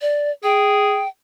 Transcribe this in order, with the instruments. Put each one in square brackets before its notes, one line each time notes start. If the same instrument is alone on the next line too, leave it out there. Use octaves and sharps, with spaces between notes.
[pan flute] D5
[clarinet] G#4 [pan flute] G5